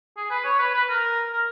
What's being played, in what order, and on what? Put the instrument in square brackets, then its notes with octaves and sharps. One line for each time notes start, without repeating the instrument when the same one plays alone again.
[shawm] G#4
B4
C#5
B4
B4
A#4
A#4